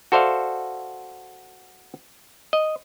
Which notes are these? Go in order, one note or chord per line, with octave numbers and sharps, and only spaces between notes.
F#4 A4 C5 D5 E5 F5
D#5